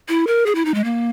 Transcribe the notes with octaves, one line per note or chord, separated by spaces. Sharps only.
E4
A#4
G#4
E4
D#4
G#3
A#3